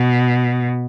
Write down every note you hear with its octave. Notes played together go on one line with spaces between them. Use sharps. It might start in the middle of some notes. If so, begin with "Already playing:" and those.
Already playing: B2